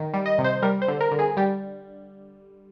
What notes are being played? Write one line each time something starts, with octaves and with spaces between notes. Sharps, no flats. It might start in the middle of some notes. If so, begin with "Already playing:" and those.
Already playing: D#3
G3
D#5
C3
C5
G3 A#4
C5
D3
A#4
D3
G#4
G3 G4